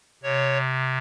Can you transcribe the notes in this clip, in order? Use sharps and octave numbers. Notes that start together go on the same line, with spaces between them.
C3 C#5